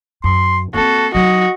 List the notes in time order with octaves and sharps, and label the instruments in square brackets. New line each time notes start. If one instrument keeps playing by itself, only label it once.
[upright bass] F#2 [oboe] C6
[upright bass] A#3 C4 [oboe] F#4 [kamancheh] A4
[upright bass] F#3 D#4 [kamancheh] F#4 [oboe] D#5